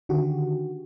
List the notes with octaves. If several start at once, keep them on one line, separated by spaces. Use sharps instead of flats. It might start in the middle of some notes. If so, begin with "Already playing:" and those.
D3 D#3 F#4 G4